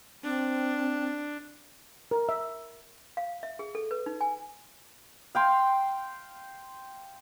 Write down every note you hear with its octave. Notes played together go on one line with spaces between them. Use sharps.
C4 D4
A#4
E5
F5
E5
G#4
A4
B4
D#4
G#5
F5 G5 C6